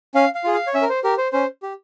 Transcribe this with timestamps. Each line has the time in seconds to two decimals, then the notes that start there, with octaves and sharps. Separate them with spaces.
0.15 C#4 F5
0.35 F5
0.44 F4 G#4
0.54 F5
0.67 C#5
0.74 C#4 E5
0.82 A#4
0.89 C5
1.04 G4 A#4
1.18 C5
1.32 C#4 C5
1.63 G4